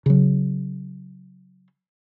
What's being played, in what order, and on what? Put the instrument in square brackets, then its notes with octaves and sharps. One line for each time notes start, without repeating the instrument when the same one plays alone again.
[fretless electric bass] C#3 F#3